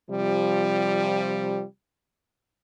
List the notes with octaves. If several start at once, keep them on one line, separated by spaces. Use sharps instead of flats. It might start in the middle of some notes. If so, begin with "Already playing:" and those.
C3 F3 G3